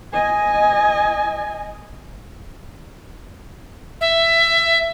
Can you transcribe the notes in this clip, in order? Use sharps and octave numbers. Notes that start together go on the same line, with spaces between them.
D#5 G#5
E5